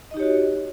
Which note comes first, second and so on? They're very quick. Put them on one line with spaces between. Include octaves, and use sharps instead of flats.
D#5 D#4 G4 C#5 F#4